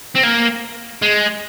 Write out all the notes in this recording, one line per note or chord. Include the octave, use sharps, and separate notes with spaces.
C4
A#3
G#3